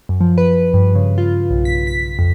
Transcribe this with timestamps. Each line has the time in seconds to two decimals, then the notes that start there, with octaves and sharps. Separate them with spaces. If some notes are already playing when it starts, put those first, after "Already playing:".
0.09 F#2
0.21 F3
0.38 B4
0.74 G2
0.95 C#3
1.18 F4
1.50 B1
1.65 B6
1.87 B6
2.19 F2